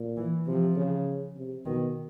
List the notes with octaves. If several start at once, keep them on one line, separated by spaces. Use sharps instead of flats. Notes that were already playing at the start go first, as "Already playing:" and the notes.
Already playing: A#2
E3
C3 F3
C#3
C3
B2 D#3